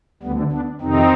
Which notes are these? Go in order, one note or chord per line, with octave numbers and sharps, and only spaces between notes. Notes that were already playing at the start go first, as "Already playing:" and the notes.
D2 D3 G3 B3
B3 D4
F2 C3 D#3 C4 D#4